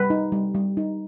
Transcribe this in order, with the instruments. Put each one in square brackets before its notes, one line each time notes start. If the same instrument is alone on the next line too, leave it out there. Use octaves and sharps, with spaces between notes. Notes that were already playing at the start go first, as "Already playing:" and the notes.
Already playing: [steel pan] G3 B4
D#4
G3
G3
D#4